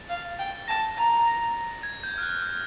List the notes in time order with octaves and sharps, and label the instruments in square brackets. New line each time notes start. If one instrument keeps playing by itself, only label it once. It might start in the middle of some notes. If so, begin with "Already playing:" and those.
Already playing: [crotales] A6
[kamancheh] F5
G5
[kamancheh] A5 [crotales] A#6
[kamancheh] A#5
[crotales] G#6
G6
F6
F#6
F6